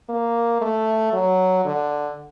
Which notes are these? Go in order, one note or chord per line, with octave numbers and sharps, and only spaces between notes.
A#3
A3
F#3
D3